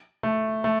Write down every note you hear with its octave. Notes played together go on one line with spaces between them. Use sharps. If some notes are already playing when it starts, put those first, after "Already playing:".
A3
A3